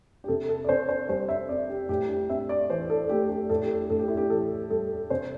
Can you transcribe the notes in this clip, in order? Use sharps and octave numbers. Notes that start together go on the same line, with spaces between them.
G4
C3 A4
A4
D5
C3 C5
C5
G3 C5
E5
C4 D5
G4
A2 G4
G4
C4 E5
D5
E3 C5
A4
A3 G4
G4
A2 A4
G4
A4
A2 A4
G4
E4
G4
E3 A4
G3 A4
C3 C5